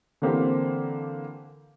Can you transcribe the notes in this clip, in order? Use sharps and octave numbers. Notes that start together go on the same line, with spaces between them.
D3 E3 A#3 C4 G4 C5